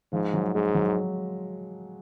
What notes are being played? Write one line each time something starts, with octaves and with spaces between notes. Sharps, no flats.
G#2 F3
F#3
G#2 G#3
F#3